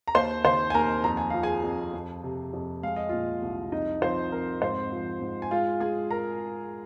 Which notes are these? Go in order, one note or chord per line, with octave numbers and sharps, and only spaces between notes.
A#5
D#2 C5 C6
D#3 C5 C6
G#5
D#2 A#4 A#5
F2 A#5
G#5
F3 F5
G#4 G#5
F2
F2
C3
F2
G#3 F5
D#5
A#2 F4 F5
C2
F2 D#4 D#5
F3 C4 C5
F2 A#4
G#2 C4 C5
F3
G#2
G#5
G#3 F4 F5
G#3 G#4 G#5
A#4 A#5